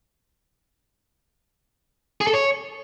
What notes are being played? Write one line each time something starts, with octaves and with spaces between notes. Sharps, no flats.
G#4
A4
C#5